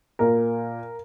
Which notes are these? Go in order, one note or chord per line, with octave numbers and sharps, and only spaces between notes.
A#2 A#4